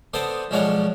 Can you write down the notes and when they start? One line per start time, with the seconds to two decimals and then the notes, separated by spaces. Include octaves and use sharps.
0.14 D3 B3 C5 D5 A5 D#6
0.51 B1 F3 G#3 D4 C#5 F#5